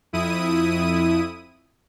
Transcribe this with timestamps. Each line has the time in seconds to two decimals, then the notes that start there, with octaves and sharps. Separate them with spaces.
0.13 F2 E4 D#6 D#7